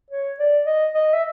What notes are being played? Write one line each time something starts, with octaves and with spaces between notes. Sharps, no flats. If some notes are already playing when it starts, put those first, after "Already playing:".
C#5
D5
D#5
D#5
E5